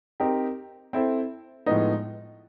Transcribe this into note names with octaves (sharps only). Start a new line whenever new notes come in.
C4 D#4 G4 A#4
C4 E4 A4 C5
A2 F3 G#3 B3 D#4